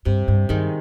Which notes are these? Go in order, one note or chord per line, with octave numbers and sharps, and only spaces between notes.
G2 C3
G2
G2 D#3 G#3 D#4